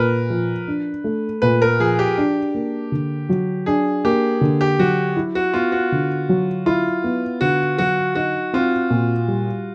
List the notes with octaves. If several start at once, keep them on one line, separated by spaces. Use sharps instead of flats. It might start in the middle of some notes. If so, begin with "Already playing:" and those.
Already playing: A#2 A#4 B4
F3
D4
A3
A#2 B4
A#4
F3 G#4
G4
D4
A#3
D3
F#3
D4 G#4
A#3 G4
D3
G4
F#3 F#4
E4
F#4
B3 F4
F#4
D3
F#3
E4 F4
B3
D3 F#4
F#3 F#4
D#4 F#4
C4 F4
A#2
G3